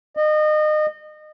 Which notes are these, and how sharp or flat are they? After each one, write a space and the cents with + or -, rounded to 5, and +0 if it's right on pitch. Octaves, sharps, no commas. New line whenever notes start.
D#5 -30